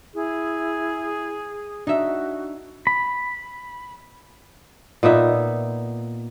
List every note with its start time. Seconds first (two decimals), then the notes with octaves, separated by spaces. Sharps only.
0.14 E4 G#4
1.87 D4 D#4 F#4 E5
2.87 B5
5.03 A#2 B3 D#4 E5